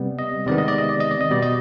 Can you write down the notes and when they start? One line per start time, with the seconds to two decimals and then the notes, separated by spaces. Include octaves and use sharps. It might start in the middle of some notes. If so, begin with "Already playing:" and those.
Already playing: C3 G3 B3
0.19 D#5
0.47 C3 D#3 G#3 B3 D5
0.58 D#5
0.68 D5
0.78 D#5
0.89 D5
1.00 D#5
1.11 D5
1.21 D#5
1.30 B2 G3 B3 D5
1.43 D#5